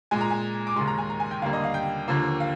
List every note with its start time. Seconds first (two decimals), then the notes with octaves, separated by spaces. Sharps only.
0.11 A#2 G#3 G#5
0.21 A#5
0.31 G#5
0.67 D6
0.76 D#2 D#3 G#3 C6
0.87 A#5
0.98 G#5
1.10 A#5
1.20 G#5
1.31 G5
1.42 D#2 D3 G3 A#3 F5
1.53 D#5
1.64 F5
1.74 G5
2.08 D#2 D3 F3 A#3
2.40 F5